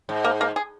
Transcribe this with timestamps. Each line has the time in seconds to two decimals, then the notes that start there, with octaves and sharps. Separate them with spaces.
0.09 G#2
0.24 A#3
0.41 A#3
0.56 G#4